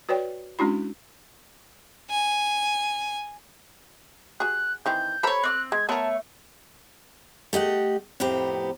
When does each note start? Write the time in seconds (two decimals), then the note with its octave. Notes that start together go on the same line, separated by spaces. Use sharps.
0.09 F#4 B4 C#5 D5 G5
0.59 G#3 C#4 D4 E4 F#4 B5
2.10 G#5
4.40 F#4 G#4 F#6
4.86 D#3 E3 C4 G6
5.23 A4 C5 C#5 A#5 B5
5.43 C4 D6 F6 F#6
5.72 G#3 G#6
5.89 A3 B3 A#4 C#5 A5 C#6
7.53 A3 G4 D#5 F#5
8.20 F2 A2 B3 C4 G4 A#5